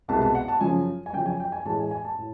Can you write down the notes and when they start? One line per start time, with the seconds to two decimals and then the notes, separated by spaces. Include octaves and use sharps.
0.08 C2 B2 G#3 B3 A5
0.22 A5
0.35 F#5
0.48 A5
0.60 F#2 C#3 F3 G#5
1.06 G#5
1.13 F#2 C#3 F3 G5
1.26 G#5
1.40 G5
1.52 G#5
1.65 A2 E3 G#3 A5
1.79 G#5
1.91 G#5
2.04 A5
2.18 A2